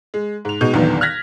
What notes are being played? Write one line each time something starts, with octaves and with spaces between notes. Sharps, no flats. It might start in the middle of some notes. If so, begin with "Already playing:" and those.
G#3
G#2 F7
B2 G#3 D#4 G6
B1 E2 A#2 D3 D#3 B3
F6 F#6 G#6 A#6 B6